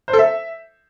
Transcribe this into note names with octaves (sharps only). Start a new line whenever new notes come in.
C5
A4
E5